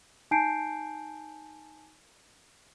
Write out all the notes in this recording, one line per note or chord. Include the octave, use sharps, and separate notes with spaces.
D#4 G#5 A5 G6 C7 D7